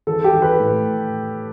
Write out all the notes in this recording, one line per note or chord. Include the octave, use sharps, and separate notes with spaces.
E3 A4
G4
E3
B4
A2